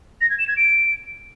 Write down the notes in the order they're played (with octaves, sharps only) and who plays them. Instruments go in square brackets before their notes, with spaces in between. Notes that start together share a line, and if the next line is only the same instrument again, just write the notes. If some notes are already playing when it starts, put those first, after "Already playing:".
[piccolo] A#6
G#6
E7
G#6
D7